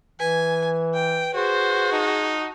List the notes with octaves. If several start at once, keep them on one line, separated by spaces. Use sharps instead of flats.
E3 B4 G#5
G5
F#4 G#4 C5
D#4 A5